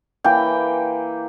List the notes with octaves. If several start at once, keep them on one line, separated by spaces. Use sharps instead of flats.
E3 A#3 G5